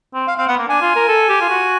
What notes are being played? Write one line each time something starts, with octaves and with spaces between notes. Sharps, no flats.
C4
F5
C4 F5
B3 F#5
A#3
D4 G#5
F4
A#4
A4
G4
F4
F#4